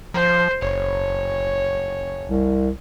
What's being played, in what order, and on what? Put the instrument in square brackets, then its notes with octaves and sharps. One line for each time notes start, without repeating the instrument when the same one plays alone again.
[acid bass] F3 [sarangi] C5
[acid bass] F#1 [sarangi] C#5
[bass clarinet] C2